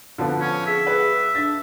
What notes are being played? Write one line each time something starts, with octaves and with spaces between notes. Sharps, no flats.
D3 F3 B3
C#4
G#4 E5
B4
D4 A6